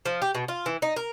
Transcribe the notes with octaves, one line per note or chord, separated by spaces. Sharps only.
F3
G4
B2
F4
E3
D#4
A#4